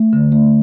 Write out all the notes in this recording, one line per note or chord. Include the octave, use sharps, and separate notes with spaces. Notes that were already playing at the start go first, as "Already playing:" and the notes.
Already playing: A3
D3
A3